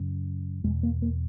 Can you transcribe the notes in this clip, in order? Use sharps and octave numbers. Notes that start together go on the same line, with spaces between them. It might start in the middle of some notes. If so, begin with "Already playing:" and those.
Already playing: F#2 C#3
E2 B2 G#3
A#3
A#3